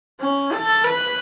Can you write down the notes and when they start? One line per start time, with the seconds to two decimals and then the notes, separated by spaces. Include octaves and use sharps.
0.20 C#4
0.53 A4
0.84 B4